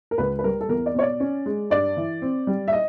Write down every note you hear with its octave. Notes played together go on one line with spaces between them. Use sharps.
A#4
C#2 B4
B4
G3 A#4
A4
E2 A#4
D5
B2 C#5
D5
C#4
G#3
G2 D5
E3
C4
G3
E5
D#5